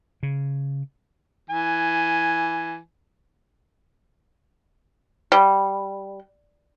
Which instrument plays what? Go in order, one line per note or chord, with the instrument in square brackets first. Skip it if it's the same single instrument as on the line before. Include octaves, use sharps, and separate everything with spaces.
[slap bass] C#3
[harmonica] E3 G#5
[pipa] G3